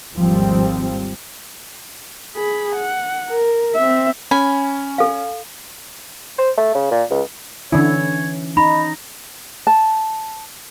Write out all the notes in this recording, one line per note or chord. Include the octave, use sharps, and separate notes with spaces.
G#1 D#2 F3 G3 C4
G#4 B5
F#5
A#4
C4 E5
C#4 G#5 B5
A4 F5
C5
A3
C#3
A#2
C#2
D3 E3 C#4 E4 C#5
D#4 A#5 B5
A5